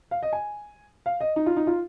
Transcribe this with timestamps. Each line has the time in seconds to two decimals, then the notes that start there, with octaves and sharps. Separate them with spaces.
0.11 F5
0.23 D#5
0.32 G#5
1.06 F5
1.21 D#5
1.36 D#4
1.46 F4
1.57 D#4
1.67 F4